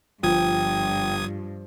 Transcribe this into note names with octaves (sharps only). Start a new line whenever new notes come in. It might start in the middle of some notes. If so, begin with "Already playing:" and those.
G1 G2 F3 G5 D#6 G#6